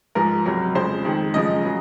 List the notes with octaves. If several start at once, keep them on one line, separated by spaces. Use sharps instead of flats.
G#2 F3 G#3 A#4
C#2 C3 F#3
F2 C#3 F3 G#3 C5
F2 D#3 G#3
F#2 C#3 F3 G#3 D#5
C#3 F#3